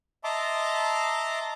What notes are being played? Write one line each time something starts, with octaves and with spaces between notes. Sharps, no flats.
D#5 E5 A5 A#5 C6 D6